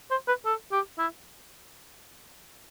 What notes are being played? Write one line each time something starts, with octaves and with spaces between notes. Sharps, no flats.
C5
B4
A4
G4
E4